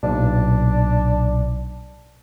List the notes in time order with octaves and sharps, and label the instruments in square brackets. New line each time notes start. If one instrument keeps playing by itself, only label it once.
[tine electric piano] B1 A#2 [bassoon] D4